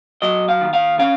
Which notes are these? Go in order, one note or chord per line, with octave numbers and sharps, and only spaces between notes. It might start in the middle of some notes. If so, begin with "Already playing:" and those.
F#3 D#5
F5
D#3
F5
C#4 F5